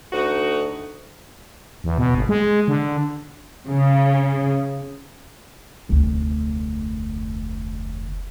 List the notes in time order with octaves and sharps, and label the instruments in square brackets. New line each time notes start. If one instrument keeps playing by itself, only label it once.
[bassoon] D2 [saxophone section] D#4 F#4
[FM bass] E2
B2
G#1
G#3
D3
[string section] C#3
[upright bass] F1 D2